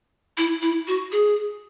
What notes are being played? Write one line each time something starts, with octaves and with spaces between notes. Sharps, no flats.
E4
E4
F#4
G#4